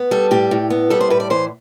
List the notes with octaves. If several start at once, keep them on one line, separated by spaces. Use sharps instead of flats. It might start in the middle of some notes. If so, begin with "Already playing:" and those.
Already playing: B3
G3 A4
A2 G4
A2
B3
G3 A4
C5
A2 B4
D5
E3 C5